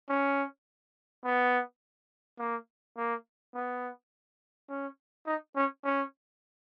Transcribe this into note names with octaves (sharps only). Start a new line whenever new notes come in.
C#4
B3
A#3
A#3
B3
C#4
D#4
C#4
C#4